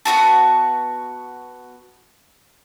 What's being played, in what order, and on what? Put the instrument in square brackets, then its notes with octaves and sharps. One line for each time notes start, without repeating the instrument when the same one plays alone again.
[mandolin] B3 E4 F#4 A5